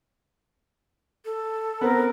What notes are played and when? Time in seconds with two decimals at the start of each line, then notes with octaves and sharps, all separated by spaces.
1.25 A4
1.81 B3 C4 A#4